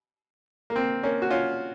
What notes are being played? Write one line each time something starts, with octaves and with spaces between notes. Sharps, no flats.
A#3
C4
A#3 C#4
F#4
C#4 F4